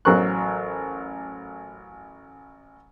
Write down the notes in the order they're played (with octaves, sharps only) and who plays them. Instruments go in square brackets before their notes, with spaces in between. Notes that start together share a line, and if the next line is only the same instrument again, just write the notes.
[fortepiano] A1 F#3 A#4 C5 C#6 F#6